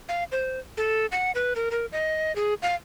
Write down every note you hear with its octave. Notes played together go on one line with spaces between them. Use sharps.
F5
C5
A4
F#5
B4
A#4
A#4
D#5
G#4
F5